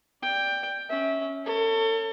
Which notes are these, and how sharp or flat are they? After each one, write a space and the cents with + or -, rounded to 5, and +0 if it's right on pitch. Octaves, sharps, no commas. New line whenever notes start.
D5 +0 G5 +10
C#4 +0 E5 -20
A4 +35 C#5 +0